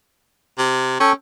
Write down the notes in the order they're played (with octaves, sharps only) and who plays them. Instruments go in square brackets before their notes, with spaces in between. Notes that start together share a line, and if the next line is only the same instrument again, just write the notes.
[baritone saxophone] C3
[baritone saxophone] C#4 [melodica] A4 G5 C#6